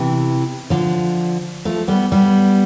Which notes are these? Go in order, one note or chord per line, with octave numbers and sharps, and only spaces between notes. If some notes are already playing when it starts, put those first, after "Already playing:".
Already playing: C3 E3
D3 F3
F3 A3
G3 B3
G3 B3